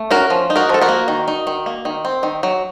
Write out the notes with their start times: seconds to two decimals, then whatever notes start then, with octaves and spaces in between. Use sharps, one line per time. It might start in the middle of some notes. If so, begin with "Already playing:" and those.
Already playing: A3
0.11 C#4 F#4 A#4
0.30 F3
0.50 D#4
0.56 F#4 A#4
0.69 F3 A4
0.81 F#4 A#4
0.88 A#3
1.08 D#3
1.28 D#4
1.47 D#3
1.66 A#3
1.85 D#3
2.05 C4
2.23 D#3
2.43 F#3